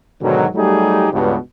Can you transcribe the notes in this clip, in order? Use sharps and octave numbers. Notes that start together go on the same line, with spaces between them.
G#2 B2 D3 D#3 F#3
F#3 G3 A3 D#4 G4 G#4
C#2 G2 B2